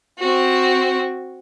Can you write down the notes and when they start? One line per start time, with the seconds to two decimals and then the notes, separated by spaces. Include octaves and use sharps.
0.18 C4 F#4